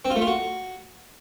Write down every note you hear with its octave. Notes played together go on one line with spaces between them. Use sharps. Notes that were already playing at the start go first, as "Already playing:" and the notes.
C4
F4
A3
F4
F#4